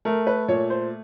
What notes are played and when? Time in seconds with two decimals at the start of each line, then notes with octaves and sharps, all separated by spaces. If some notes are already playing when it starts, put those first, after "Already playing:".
0.05 A3 A#4
0.27 B4
0.48 A#2 C#5
0.70 C5